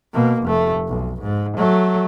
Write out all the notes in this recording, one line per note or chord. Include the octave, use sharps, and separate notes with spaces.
B2 A#3
F1 A3
B1
G#2
F#3 A3